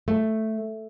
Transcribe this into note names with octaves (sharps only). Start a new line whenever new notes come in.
A3